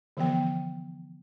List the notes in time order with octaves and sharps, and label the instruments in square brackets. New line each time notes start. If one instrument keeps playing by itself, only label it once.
[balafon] D3 E3 F3 B3 G5